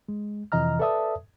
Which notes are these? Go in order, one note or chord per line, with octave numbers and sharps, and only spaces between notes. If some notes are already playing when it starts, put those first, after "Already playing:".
G#3
F2 C3 E3 D#5 A#5 F6
A4 B4 D5 E5 A5 D#6